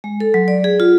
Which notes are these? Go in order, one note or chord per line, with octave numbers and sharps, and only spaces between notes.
G#3
A4
F#3
D5
G#4
F4